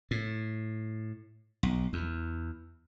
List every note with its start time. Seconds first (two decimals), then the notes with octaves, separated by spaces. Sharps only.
0.11 A2
1.63 B1
1.93 E2